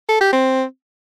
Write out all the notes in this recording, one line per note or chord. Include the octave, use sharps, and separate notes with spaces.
A4
G4
C4